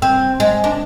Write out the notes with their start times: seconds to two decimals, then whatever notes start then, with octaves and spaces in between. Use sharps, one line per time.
0.02 C4
0.40 G#3
0.64 D4